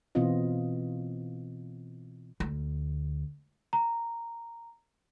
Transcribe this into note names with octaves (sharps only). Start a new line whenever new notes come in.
B2 E3 B3 C4 F4 D#5
D2
A#5